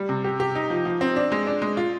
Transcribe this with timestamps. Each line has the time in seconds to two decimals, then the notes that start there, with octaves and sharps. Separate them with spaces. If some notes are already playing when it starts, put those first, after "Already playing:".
Already playing: G3
0.09 C3
0.24 G4
0.40 G4
0.55 D#4
0.70 F3
0.85 F3
1.01 C4
1.16 D4
1.32 G#3
1.47 D4
1.62 G#3
1.77 F4